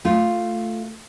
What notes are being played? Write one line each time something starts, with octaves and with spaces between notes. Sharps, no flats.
A3 F4